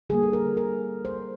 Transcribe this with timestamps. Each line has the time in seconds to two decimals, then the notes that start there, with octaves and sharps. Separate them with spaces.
0.10 D3 G3 A#3 G#4
0.23 A4
0.33 A#4
0.57 A#4
1.05 C5